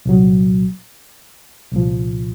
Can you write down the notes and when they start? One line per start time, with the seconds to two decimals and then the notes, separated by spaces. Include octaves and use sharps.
0.05 C2 A#2 F#3
1.72 C2 A#2 F3